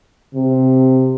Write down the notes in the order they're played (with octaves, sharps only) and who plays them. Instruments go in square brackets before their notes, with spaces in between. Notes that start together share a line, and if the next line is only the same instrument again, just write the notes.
[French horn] C3